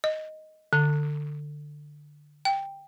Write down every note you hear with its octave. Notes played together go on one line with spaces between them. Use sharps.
D#5
D3
G5